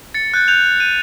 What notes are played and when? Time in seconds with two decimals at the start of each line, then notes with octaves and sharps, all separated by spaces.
0.14 A6 C#7
0.34 F#6 G6 A6
0.48 F#6 G6 F7
0.80 G6 D#7